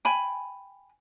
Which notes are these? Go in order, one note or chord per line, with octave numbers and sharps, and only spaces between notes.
G5 G#5 B5